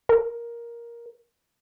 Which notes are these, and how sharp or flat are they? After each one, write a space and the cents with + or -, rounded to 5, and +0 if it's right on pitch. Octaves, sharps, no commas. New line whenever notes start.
A#4 +10